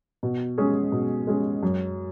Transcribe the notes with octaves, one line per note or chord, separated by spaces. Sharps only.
B2
G#3 C#4 G#4
B2
G#3 C#4 G#4
F#2